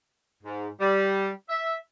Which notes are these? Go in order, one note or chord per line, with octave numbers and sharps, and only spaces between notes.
G#2
G3
E5